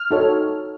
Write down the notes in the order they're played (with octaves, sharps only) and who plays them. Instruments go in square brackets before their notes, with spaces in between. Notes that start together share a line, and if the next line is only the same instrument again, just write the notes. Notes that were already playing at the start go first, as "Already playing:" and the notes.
Already playing: [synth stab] F6
[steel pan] D#4 F#4 A4 C#5